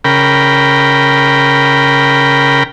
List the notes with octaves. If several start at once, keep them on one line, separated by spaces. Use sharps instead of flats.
C#3 A#4 G5 B5